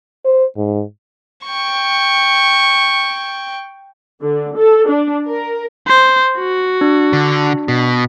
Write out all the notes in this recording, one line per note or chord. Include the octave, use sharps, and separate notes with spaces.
C5
G#2
G5 C#6
D3
A4
D4
A#4
C5
F#4
D4
D3
B2